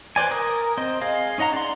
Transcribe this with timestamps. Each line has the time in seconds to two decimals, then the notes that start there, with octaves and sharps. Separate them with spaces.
0.16 B4 C5 D5 G#5
0.31 A#4 D#6
0.77 C4 C5 D#5
1.01 G#4 D#5 F5
1.38 C#4 D#4 D#5 F#5 A#5
1.53 D5 C6